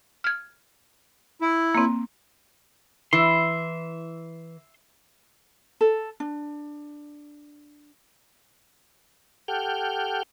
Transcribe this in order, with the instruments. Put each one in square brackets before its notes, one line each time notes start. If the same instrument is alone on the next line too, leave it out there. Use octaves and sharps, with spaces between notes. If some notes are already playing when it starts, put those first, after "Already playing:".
[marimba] F6 G#6
[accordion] E4
[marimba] A#3 C4
[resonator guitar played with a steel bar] E3 [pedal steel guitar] E5 C6
[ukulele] A4
D4
[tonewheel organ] G4 A4 F#5 G5 F6 G6